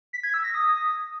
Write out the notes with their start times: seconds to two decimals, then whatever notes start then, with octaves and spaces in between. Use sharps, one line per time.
0.13 B6
0.23 G#6
0.34 E6
0.44 A#6
0.54 D#6